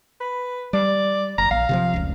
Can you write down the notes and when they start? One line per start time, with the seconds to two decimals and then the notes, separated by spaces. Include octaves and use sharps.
0.20 B4
0.73 G3 D5
1.38 F#1 A#5
1.51 A#1 F5
1.69 C3 E3 F3
1.94 F1 C#2